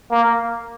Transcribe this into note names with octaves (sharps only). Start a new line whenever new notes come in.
A#3